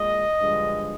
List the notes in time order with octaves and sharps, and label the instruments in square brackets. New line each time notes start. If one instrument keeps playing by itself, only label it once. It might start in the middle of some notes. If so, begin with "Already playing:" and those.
Already playing: [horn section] A#2 G#3 D#5
G2 D3 F3 G#3